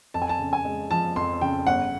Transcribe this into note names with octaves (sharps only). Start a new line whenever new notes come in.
F2 A5
G#5
A5
C#3
G#5
G#3
F3 A5
F2 C6
C#3 G5
G1 F#5